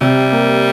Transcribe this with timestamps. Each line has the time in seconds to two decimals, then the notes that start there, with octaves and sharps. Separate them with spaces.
0.01 C3 G3
0.32 A#3